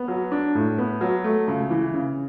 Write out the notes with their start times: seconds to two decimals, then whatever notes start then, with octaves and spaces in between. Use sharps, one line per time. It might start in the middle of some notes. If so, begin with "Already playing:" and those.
Already playing: B3
0.08 F#3
0.32 D4
0.55 A2
0.78 B3
1.01 F#3
1.24 A3
1.48 C#2
1.70 E3
1.94 C#3